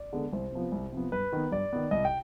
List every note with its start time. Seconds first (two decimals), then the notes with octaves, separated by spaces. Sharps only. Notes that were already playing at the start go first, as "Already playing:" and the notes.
Already playing: D5
0.13 D3 G#3 B3
0.33 C2 C5
0.52 C3 F3 B3
0.72 C2
0.92 C3 F3 B3
1.12 G2 B4
1.33 D#3 B3
1.52 G2 D5
1.73 D#3 B3
1.91 C2 D#5
2.05 G5